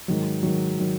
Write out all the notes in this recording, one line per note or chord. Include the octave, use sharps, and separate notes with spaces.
G#2 D#3 F#3
G#2 D#3 F#3
D#3 F#3